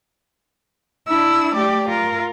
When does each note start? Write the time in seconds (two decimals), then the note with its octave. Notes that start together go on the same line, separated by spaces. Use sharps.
1.08 D4 E4 E6
1.55 A3 G4 D5
1.89 F4 A#4